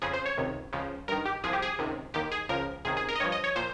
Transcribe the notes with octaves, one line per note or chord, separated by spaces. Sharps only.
F2 C#3 F3 G#4
C5
C#5
C#2 C3 D#3
C#2 C#3 F3
G2 D#3 A#4
G4
C2 C3 F3 G#4
G4
G#4
C#2 C3 D#3
D#2 D#3 G4
G#4
C#2 C#3 F3 A#4
C#2 C3 D#3 G#4
G#4
A#4
D#5
G2 F3 C#5
D#5
C#5
A#2 F3 C5